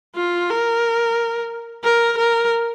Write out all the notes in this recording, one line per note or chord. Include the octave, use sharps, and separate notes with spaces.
F4
A#4
A#4
A#4